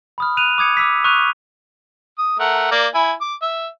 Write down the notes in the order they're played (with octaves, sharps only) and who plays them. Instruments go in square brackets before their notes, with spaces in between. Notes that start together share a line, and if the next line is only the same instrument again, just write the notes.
[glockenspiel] B5 D#6 F6
F6 F#6 D#7 F7
D6 D#6 G#6 C#7
D6 E6 B6
C#6 D#6 F6 F#6 D#7 F7
[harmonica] D#6
A3 A#4 F#5
A#3 D5
E4 G#5
D6
E5